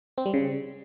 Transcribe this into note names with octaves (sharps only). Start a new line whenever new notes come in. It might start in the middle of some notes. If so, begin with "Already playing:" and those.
C4
G3
C#3